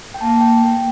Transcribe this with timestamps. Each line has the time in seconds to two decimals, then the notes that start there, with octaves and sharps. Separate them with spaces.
0.14 G5
0.20 A#3 A5
0.41 G5
0.63 G5